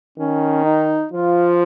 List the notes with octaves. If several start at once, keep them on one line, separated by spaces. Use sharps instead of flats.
D#3 C#4
D#4
F3 F4